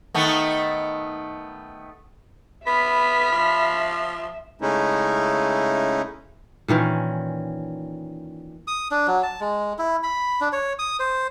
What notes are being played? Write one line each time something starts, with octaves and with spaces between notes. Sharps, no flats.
D#3 A3 B3
B3 E5 B5 F6 B6
F3
C#3 G#3 A3 C#4 D#4 E4
A#2 D#3 E3 C#4
D#6
D4
F#3
A5
G#3
E4
B5
D4
C#5
D#6
C5